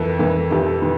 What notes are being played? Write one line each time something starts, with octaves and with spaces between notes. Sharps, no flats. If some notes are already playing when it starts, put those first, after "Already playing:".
Already playing: F2 E3 A#3 A4
F2 E3 A#3
F2 E3 A#3 G4
A4
E3